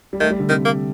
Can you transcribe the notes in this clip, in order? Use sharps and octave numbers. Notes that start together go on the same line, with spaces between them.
G3
D#3 A3
G3
D3
C3 D#3
A#3